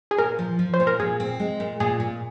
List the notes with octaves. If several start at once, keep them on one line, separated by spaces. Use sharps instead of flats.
G#4
A#2 A#4
F3
F3
C5
A#2
A#4
A#2 G#4
C4
G#3
A#2
A#2 G#4
A#2